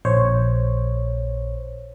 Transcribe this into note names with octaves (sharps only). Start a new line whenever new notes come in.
A#1 C5 C#5